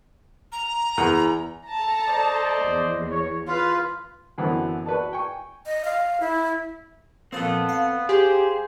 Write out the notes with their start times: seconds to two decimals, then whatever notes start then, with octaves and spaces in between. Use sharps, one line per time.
0.52 A#5
0.98 E2
1.70 A4 A5 A#5
2.08 C5 D5 D#5
2.63 E2
3.10 C#5
3.48 F4 B4 F5
4.38 F#2 D3 E3 F#3 B3 C4
4.86 F#4 B4 D5 A5
5.13 G5 G#5 C#6
5.66 D#5
5.85 F5
6.20 E4
7.33 A#2 F3 B3 C4 A4 A5
7.69 F5
8.09 G4 G#4 C5